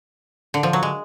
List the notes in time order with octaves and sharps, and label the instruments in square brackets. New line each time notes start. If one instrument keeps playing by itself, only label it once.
[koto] D3
F3
F#3
G#3